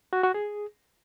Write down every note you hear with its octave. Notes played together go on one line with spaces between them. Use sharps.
F#4
F#4
G#4